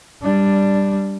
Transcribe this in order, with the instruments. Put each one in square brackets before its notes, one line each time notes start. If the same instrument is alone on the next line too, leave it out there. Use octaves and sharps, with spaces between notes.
[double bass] G3 D4